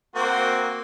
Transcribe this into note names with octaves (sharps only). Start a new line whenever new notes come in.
A#3 C4 F#4